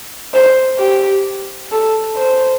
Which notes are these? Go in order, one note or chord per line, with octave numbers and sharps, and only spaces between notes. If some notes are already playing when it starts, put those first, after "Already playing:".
C5
G4
A4
C5